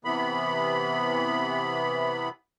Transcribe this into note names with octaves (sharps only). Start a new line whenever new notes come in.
C3 E3 B3 B5